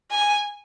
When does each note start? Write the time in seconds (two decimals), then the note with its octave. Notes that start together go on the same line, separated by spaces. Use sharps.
0.11 G#5